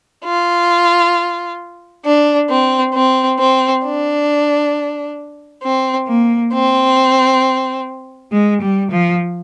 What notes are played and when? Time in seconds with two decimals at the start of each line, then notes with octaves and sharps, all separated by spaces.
0.24 F4
2.05 D4
2.49 C4
2.94 C4
3.38 C4
3.84 D4
5.63 C4
6.08 A#3
6.52 C4
8.33 G#3
8.61 G3
8.91 F3